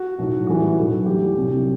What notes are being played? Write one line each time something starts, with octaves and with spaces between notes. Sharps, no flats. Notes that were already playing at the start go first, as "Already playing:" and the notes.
Already playing: F#4
B1 A2 F#3 A3
A1 A2 E3 G3 F#4
B1 A2 F#3 A3
E2 D3 G3 G4
C2 C3 F#3